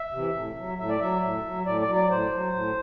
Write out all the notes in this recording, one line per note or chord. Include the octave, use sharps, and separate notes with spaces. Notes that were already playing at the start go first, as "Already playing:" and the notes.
Already playing: E5
C3 E3
A2
F#3
A2 E5
D5
F#3 E5
A2
F#3
A2 D5
D5
F#3
D5
A2 C5
F#3
A2